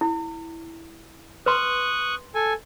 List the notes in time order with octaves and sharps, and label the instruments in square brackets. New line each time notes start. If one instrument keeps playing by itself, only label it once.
[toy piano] E4
[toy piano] B4 C6 [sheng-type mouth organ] C#6 D#6 F#6
[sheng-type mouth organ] A4 G#5